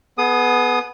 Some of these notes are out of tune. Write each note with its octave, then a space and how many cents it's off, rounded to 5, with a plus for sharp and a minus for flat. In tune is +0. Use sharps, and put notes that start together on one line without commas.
B3 +0 G#4 +35 D#6 -5